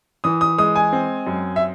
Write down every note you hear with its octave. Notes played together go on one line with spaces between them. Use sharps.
E3 D#6
D#6
G#3 D#6
G#5
C4
F#2
E5